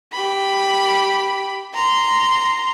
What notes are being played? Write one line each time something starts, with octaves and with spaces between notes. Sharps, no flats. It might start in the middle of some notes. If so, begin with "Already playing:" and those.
G4 B5
A#5 C6